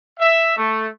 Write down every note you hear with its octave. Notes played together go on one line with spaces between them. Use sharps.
E5
A3